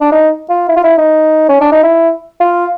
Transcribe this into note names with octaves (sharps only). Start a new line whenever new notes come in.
D4
D#4
F4
E4
F4
E4
D#4
C#4
D4
D#4
E4
F4